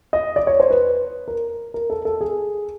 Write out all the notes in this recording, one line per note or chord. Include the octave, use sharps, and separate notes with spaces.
D#5
D5
C#5
C5
B4
A#4
A#4
A4
A4
G#4